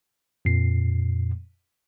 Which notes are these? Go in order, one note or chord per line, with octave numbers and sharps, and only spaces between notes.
F2 A#2 C7